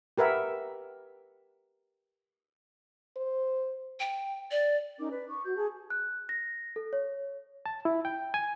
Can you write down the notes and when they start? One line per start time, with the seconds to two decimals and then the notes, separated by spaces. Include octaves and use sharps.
0.18 G4 A#4 B4 E5 F#5
3.16 C5
4.00 G5
4.51 D5
4.99 C#4 D#4 A#4 D6
5.11 B4 D5
5.27 C#6 D6
5.44 F#4 G6
5.56 G#4 A5
5.90 F#6
6.29 A#6
6.76 A4
6.93 C#5
7.66 A5
7.85 E4
8.05 G5
8.34 G#5